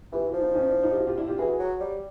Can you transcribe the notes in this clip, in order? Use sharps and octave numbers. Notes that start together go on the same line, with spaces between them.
E3 F4 G4
E4 F#4
F3
D#4 F4
C#4 D#4
D4 E4
D#4 F4
G4
E4 F#4
F4 G4
D4 E4
F4 G4
E3 F#4 G#4
F#3
G3